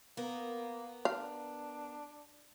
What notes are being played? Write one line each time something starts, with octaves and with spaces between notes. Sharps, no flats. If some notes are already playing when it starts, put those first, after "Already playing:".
A#3 B3 A#4
D4 F5